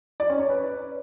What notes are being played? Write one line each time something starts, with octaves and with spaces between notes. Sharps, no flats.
D5
C#4
C#5
B4